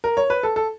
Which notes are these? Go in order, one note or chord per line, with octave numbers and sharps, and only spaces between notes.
A#4
C#5
B4
A4
A4